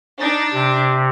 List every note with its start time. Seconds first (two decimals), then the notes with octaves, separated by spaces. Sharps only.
0.20 D4 D#4 A6
0.54 C3